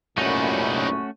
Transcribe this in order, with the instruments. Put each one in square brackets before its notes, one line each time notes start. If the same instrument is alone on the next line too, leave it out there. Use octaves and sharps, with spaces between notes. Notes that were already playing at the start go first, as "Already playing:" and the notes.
[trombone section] C2 F#2 A#2 [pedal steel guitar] A3 C#4 F#4 [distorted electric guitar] D#4 B4